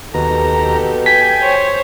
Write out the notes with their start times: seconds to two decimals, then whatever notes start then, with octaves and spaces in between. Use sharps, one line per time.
0.14 D#2 B2 G4 A4 A#5
1.06 G5 G#5 B6
1.41 C5 C#5